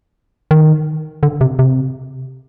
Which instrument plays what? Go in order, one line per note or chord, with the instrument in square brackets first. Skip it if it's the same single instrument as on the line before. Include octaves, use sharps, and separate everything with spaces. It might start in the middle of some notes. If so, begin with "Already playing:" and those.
[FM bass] D#3
D3
C3
C3